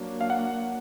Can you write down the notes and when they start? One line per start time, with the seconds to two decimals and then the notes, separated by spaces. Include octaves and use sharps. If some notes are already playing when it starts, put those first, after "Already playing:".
Already playing: F#3 A#3 D4
0.21 F5
0.30 F#5